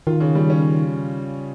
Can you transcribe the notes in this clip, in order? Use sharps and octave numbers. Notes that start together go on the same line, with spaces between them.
D#3 F4
C#3
G3
C#4